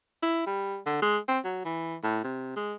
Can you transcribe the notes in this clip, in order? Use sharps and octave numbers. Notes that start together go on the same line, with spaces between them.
E4
G3
D3
G#3
C4
F#3
E3
A2
C3
G#3